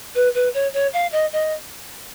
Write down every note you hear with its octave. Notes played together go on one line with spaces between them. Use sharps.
B4
B4
C#5
C#5
F5
D#5
D#5